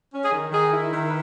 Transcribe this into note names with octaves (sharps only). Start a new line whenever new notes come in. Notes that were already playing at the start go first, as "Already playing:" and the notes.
C#4
G#4
D#3
D#3 G#4
E4
D#3
B4